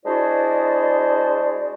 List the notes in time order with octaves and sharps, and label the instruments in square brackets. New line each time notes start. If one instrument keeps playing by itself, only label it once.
[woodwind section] G#3 D4 E4 F#4 C5 D5